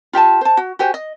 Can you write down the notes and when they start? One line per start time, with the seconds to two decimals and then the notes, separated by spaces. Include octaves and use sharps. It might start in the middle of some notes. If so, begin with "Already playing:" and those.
0.13 F4 G4 G5 A5
0.41 C5 A5
0.57 F#4
0.79 F#4 G4 C5 G#5
0.94 D#5